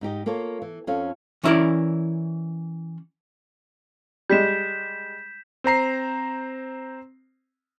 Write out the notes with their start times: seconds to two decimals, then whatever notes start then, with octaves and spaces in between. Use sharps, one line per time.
0.01 G#2 D#4 G4 D#5
0.26 A#3 F4 A4 C#5
0.62 E3
0.87 F2 C#4 A4 F5
1.44 E3 C#4 E4 A#4 D5
4.30 G3 G#3 G6 B6 E7
5.64 C4 C5 A#5 C7